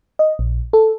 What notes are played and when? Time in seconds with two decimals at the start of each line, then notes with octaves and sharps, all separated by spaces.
0.19 D#5
0.39 A#1
0.73 A4